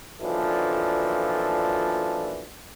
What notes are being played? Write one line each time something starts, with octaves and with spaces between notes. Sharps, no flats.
B1 A#2 E3 F3 D4 A4